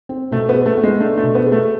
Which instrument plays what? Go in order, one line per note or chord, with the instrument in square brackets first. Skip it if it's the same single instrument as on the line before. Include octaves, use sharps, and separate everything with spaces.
[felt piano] C4
[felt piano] B2 [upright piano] A3
[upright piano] B3
[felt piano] G#4
[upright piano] A3
[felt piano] B3
[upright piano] G#3
[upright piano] A3 [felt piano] D4
[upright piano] A3
[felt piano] B2
[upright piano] B3
[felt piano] G#4
[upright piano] A3